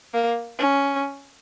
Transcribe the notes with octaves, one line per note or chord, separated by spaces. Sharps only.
A#3
C#4